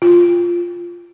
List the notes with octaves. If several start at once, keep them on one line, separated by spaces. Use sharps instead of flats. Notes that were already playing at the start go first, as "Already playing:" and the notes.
F4